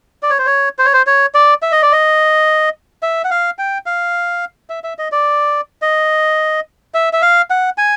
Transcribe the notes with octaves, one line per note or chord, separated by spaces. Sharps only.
D5
C#5
C5
C#5
C5
C#5
C5
C#5
D5
E5
D#5
D5
D#5
E5
F#5
F5
G5
F5
E5
E5
D#5
D5
D#5
E5
E5
F5
F#5
G#5